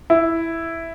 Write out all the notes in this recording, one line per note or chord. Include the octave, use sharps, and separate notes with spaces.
E4